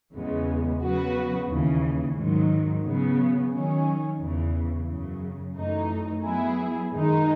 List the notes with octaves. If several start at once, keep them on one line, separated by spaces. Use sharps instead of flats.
E2 C#3 E3 G#3 B3
C#3 F#3 B3 F#4 B4
D#2 C#3 E3
G#2 D#3 F#3
C#3 F#3 B3
D#3 F#3 C#4
E2 C#3 E3
F#2 C#3 F#3
F#2 E3 A3 D#4
F#3 B3 E4 G#4
F#2 D#3 G#3 D#4